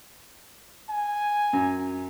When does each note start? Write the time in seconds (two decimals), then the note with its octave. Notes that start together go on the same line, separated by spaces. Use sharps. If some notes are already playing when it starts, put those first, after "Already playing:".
0.90 G#5
1.53 F#2